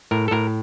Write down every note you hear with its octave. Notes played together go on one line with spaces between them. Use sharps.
A2 A#4
A4
A2 A#4